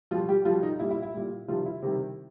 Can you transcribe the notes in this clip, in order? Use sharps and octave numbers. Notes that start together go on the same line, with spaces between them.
B2 F3 G3 F4
G3 G4
B2 F3 G3 F4
D#4
A#2 G3 E4
E4
E4
A#2 G3
C3 D#3 F3 G3 F4
E4
C3 D#3 G3